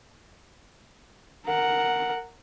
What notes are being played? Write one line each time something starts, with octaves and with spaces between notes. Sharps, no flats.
A#4 F#5